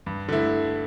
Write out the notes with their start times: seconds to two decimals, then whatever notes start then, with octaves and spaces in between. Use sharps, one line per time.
0.06 G2
0.29 D3 A3 E4